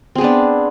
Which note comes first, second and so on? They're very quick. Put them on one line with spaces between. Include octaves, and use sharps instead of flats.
C4 G#4 B3 D4